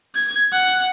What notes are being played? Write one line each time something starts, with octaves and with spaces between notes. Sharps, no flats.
G#6
F#5